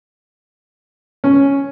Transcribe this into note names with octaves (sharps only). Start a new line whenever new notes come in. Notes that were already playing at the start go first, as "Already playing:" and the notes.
C#4